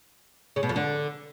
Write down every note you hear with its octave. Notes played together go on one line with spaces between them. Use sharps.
C#3
B2
F2
D3